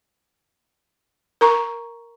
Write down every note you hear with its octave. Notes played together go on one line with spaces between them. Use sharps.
A#4 A#5 C#6